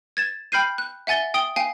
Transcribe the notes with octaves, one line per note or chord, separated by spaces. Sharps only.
G#6 A6 E7
G5 B5 F6 G6 C7 D#7
F#6
E5 F#5 G#5 A6 G7
G5 D#6 D7 G7
F5 G5 G#5 C7